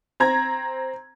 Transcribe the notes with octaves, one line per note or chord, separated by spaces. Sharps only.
C4 A#5 G#6